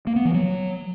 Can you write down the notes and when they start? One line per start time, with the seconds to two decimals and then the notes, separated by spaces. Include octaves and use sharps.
0.07 A#3
0.16 B3
0.25 E3
0.34 F#3